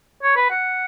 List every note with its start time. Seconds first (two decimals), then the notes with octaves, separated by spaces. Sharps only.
0.23 C#5
0.36 B4
0.51 F#5